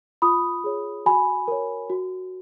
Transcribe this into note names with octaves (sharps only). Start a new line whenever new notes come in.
F4 B5 D#6
G#4 C#5
F#4 G#5 B5
A#4 C#5
F#4